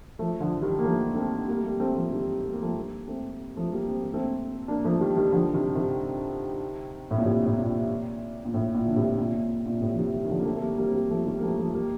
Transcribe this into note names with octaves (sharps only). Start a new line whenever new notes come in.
F3 A3
D3 F3
D#3 G3
A#3
F3 A3
A3 C4
G3 A#3
A3
G3 A#3
A3 C4
F3 A3
D#3 G3
A3
A#3
F3 A3
G3 A#3
A3 C4
F3 A3
G3 A#3
C4
A#3
A3 C4
A#3 D4
F3 A3
D#3 G3
D#3 G3
D3 F3
C3 D#3
C3 D#3
A2
A#2
A2 C3
A2
A#2
A#2
A2
A#2
D3
A2 C3
A#2
A#2
A#2
A2 C3
F3
C3 D#3
D#3 G3
D#3
D3 F3
A#3
A3 C4
A3
G3 A#3
G3 A#3
C4
G3 A#3
F3 A3
D#3 G3
A#3
F3 A3
F3 A3
G3 A#3